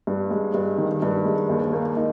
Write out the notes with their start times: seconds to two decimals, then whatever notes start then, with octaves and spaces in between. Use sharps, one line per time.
0.07 G2
0.30 G#3
0.54 G2
0.78 D#3
1.02 G2
1.25 G#3
1.49 D#2
1.73 A#3
1.97 D#4